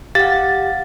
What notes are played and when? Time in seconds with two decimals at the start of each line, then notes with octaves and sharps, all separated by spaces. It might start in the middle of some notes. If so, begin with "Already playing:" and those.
0.15 G4 F5 F#5 A6